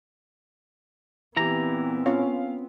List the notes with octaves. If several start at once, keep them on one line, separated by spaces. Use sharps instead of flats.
A#2 E3 B3 C4 E4 G4 A#5
C#4 F4 C#5 F5